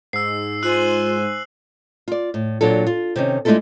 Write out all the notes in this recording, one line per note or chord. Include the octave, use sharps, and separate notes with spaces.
G#2 E6 C7
F4 C5 G#5 E6 F#6 F#7
F4 D5
A2
A#2 F#3 D4 F4 A4
F4
C3 D#3 C#4
G#3 A3 D4 E4 F4 A4